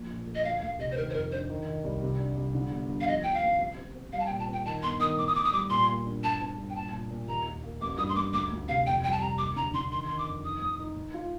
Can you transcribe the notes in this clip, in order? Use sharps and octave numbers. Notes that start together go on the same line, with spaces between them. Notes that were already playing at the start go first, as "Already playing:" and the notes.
Already playing: A#1 F3
A#2
A3
D#5
D2 F5
D2 F5
C3 D#5
C5
D#3 A#4
C5
F2 A#4
D4 C5
D#3
D#3
C2
C3
D4
C2
D3
G1
G2
F5
F3 D#5
F3 G5
F5
A1
C4
C4
C4
G3 F5
A5
G5
A#2
A5
C4 G5
D#3 A5
G1 C6
D#3 D#6
A2 D6
D#6
A2 D6
D#6
G3 D6
A#2 C6
A#3
D4
G2 A5
C4
G2
G5
A#2 A5
A#2
A#2
D#2 A#5
A#3
A#3
A1 D6
G2 D#6
C6
A1 D6
D2 D6
D2
C3 F5
F2 G5
G3 G5
A5
C3 A#5
D#2 D6
D3 A#5
D3 C6
D#3 C6
D#3 C6
D6
F2
D#4 D#6
A2
D#4
A2
F4